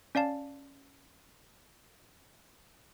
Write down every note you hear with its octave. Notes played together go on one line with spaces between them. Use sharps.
C#4 D5 F5 A5